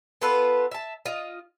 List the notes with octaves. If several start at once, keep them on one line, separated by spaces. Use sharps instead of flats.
B3 F4 A4 B4
E5 A5
F4 D#5